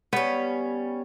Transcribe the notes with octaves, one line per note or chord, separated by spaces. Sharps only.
G3 B3 C#4